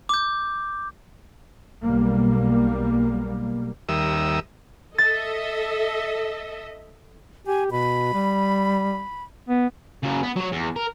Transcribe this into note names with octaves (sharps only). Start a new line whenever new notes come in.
D6 G6
B1 G3 A#3
D#2 G3 A#4 E5 D#6 E6
A4 D#5 E5 A6
G4 G#5
B2 B5
G3
B3
C#3 F#3
B3
F#3 C#5
E2
A#4